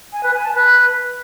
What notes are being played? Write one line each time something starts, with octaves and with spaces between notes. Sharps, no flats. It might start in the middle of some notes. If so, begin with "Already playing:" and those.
G#5
B4
G#5
A5
B4